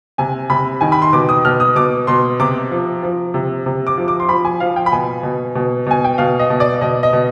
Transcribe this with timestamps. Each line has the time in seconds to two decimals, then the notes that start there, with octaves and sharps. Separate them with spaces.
0.18 C3 G#5
0.50 C3 B5
0.81 D#3 G#5
0.92 B5
1.02 C6
1.13 B2 D6
1.29 D#6
1.45 B2 F6
1.60 D#6
1.76 B2 D6
2.07 B2 C6
2.39 C3 D6
2.71 F3
3.03 F3
3.34 C3
3.66 C3
3.87 D6
3.97 F3
4.08 D6
4.20 C6
4.29 F3 B5
4.45 G#5
4.60 F3 F5
4.76 G5
4.86 B5
4.92 B2 G#5
5.23 B2
5.55 B2
5.86 B2 G#5
6.04 G5
6.18 B2 F5
6.39 D#5
6.50 B2
6.60 D5
6.81 B2 D#5
7.03 D#5
7.13 B2